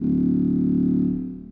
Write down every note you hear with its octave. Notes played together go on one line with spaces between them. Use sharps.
D1